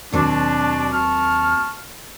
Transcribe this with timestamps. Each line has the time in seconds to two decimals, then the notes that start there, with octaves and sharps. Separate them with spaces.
0.12 D#2 B2 F#3 C4 D4
0.92 A5 C#6 F6